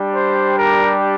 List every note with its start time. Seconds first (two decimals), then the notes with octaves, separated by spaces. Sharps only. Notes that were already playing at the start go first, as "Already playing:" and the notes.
Already playing: G3 D4 G4
0.14 C5
0.55 A#4